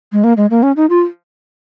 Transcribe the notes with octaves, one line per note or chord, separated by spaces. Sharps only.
G#3
A#3
G#3
A#3
C#4
D#4
F4